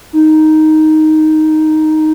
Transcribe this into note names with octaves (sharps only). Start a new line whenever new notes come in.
D#4